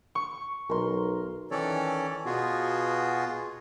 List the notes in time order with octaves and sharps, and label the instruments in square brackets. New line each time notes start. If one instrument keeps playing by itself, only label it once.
[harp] C#6
[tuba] B1 [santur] A#4 C6
[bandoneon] D#3 E3 C#4 A4 C#5 D5
B2 B3 F4 F#4 G#4